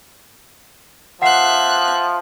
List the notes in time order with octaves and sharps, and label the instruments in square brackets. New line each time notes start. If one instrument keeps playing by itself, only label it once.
[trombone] F3 [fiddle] E5 F#6 [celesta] F#5 C7